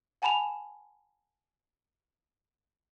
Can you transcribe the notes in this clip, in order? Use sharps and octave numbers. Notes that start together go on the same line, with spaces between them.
F#5 G#5 A5 B5 E7 F7